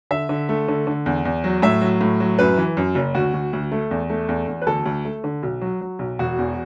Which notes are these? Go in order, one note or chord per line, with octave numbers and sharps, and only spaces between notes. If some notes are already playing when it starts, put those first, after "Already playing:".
D3 E5
D3
A3
D3
D3
E2
E2
F#3
A2 E5
F#3
A2
F#3
F#2 B4
E3
F#2
F#1
D2 F#4
D2
D2
A3
E2
A3
E2
E2
B4
D2 A4
D2
A3
D3
B1
F#3
F#3
B1
E1 F#4
E2